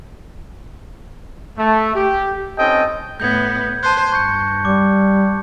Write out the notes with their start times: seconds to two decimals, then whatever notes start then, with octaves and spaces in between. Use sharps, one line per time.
1.58 A3
1.95 G4
2.58 C4 C#4 D#4 A4 D#5 G5
3.20 A2 B3 G6 G#6
3.83 C5 A5 F#6
4.12 G2 C#6 G6 C#7
4.65 G3 D6